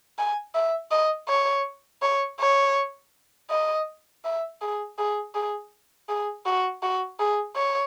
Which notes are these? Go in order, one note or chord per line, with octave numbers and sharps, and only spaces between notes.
G#5
E5
D#5
C#5
C#5
C#5
D#5
E5
G#4
G#4
G#4
G#4
F#4
F#4
G#4
C#5